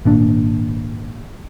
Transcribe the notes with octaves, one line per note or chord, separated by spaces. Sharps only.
G#1 A#2 D4